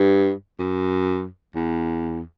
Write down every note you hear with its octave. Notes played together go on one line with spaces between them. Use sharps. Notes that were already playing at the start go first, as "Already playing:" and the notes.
Already playing: G2
F#2
E2